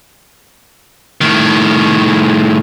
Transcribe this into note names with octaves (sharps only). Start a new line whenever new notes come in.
A2 D#3